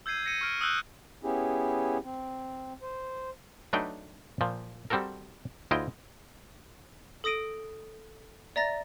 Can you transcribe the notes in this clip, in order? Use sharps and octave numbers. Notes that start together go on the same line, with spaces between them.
E6 G6 G#6 C7 D#7
A#6 C#7 D#7
C#6 F6 D7
D#6 E6 F#6 G6
B3 C#4 E4 G4 G#4
C4
C5
F#3 A3 D4 D#4 B4 G5
A#2 F3
G3 C4 F#4 A4 A#4
D2 E4 F4 D#5 G5
A4 D#6 A#6 D7 D#7
D5 E5 A#5 A6 A#6